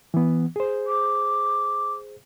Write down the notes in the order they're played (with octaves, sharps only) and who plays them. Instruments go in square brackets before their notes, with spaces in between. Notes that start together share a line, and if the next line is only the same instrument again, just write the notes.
[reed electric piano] E3 B3
G#4 C5
[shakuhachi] D6